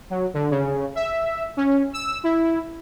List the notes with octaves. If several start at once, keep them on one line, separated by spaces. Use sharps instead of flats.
F#3
D3
C#3
E5
C#4
E6
E4